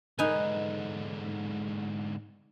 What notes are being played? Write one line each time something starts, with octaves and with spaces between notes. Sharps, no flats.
G#2 D3 D#4 B4 G#5